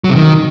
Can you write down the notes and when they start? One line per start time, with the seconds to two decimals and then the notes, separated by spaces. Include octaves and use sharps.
0.04 F#3
0.10 C3
0.16 D#3